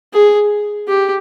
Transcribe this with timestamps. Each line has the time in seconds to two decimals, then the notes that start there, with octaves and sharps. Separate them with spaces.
0.14 G#4
0.88 G4